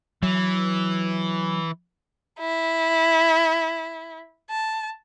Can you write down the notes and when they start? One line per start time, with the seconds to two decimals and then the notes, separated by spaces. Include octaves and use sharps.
0.23 E3 F#3
2.40 E4
4.50 A5